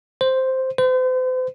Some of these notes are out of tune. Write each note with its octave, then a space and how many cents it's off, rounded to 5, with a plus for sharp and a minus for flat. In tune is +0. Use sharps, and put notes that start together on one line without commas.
C5 +0
C5 -40